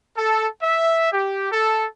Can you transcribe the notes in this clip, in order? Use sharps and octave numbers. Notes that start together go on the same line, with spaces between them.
A4
E5
G4
A4